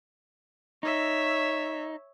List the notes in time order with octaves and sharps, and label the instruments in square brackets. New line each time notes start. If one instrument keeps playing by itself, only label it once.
[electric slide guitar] D#4 [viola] C#5 E5